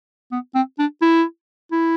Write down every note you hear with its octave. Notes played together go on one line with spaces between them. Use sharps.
B3
C4
D4
E4
E4